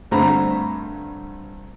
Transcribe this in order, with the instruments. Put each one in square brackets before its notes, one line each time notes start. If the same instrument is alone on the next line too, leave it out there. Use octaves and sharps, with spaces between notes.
[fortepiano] G2 D3 A3 C4 A#5 B5